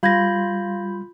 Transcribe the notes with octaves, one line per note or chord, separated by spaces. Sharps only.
G3 F4 F5 B5 G6 G#6 A#6